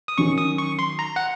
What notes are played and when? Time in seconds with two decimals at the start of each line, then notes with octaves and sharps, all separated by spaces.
0.08 D#6
0.18 D#3 F#3 C#4 C#6
0.38 D#6
0.58 C#6
0.79 C6
0.99 A#5
1.16 F#5